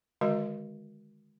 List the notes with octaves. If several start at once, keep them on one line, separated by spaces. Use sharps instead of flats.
D3 D#3 G#3 F#4 A#4 D#5